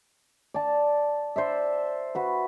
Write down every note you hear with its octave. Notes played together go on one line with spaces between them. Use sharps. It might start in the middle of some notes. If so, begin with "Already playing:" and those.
D5 A5
C5 D5 E5
F#4 B4